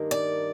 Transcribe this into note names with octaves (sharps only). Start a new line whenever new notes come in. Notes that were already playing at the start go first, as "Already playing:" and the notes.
Already playing: G2 D#3 A#3
D5